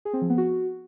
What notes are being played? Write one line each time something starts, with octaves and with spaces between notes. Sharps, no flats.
G#4
C4
F3
B3
F#4